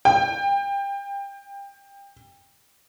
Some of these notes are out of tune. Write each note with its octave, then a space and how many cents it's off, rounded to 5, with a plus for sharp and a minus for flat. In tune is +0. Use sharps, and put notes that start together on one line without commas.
G5 +25